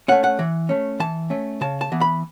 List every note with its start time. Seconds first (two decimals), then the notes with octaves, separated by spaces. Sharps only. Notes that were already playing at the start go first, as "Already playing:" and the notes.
0.08 A3 C#4 F#5
0.24 F#5
0.39 E3
0.69 A3 C#4
1.00 E3 A5
1.30 A3 C#4
1.61 C#3 A5
1.81 A5
1.92 E3 B3
2.01 B5